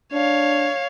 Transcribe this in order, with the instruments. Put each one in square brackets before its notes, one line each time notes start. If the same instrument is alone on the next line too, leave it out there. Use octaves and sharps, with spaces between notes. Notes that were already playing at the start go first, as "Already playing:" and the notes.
[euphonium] D4 [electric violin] C#5 F5